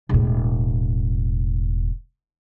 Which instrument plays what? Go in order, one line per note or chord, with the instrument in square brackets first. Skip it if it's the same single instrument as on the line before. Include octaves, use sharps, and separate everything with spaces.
[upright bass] E1 A2